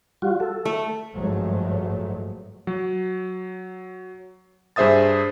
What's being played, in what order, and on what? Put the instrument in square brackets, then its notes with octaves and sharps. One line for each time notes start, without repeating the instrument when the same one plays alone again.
[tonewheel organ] G3 F4 F#4
A4
[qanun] A3
[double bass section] G#1 G2 F3 F#3 G#3 A3
[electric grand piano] F#3
G2 G#4 C5 E5 D#6 A6